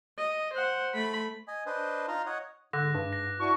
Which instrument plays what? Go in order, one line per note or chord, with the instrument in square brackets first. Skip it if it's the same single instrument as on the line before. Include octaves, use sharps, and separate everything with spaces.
[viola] D#5
C5 F#5
A3 B5
[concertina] D#5 G#5
D4 B4 C5 D#5
D#4 F4 F5 A#5 C6
C#5 D#5 F#5
[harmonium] G#2 [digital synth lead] D3 [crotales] D6 F#6 A#6
[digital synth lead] G2
[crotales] A#6
[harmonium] D4 E4 F#4 [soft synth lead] C#6